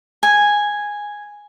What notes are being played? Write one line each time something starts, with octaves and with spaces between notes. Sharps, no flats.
G#5